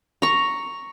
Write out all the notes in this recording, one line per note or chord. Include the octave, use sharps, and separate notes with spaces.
A#5 C#6